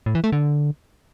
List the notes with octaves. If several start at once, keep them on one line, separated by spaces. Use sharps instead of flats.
A2
E3
A3
D3